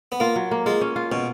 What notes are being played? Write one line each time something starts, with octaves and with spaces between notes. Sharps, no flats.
B3
A#3 F4
F#3
A#3
G#3 F4
C#4
F4
B2 C#4